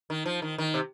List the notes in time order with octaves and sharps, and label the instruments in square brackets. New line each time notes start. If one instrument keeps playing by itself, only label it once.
[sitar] D#3
F3
D#3
D#3
C3